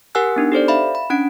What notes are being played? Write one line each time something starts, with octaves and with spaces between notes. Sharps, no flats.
G4 A#4 F#5 G#5 E6 F#6
B3 D4 D#4
G4 A4 C5 D5
E5 F5 B5
B5
C#4 D4 F#5 D7